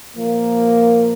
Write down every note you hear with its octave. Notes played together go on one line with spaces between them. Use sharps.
A#2 F3 A#3